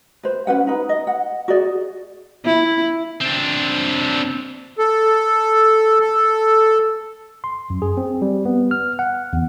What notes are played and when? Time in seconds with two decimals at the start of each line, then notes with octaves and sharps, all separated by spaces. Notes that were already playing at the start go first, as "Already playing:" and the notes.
0.23 B4 C5
0.47 C#4 F4 B4 F#5
0.67 D#4 B4
0.89 D#5
1.07 F#5
1.48 F#4 G#4 D5
2.45 E4
3.21 C4 D4
4.77 A4
6.00 A4
7.44 C6
7.70 F#2
7.82 G#4
7.97 C4
8.22 G3
8.46 B3
8.71 F6
8.99 F#5
9.33 E2